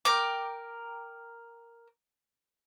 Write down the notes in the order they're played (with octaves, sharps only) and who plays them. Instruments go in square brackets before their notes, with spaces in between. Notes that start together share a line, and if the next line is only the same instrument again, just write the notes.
[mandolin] A#4 G5 D6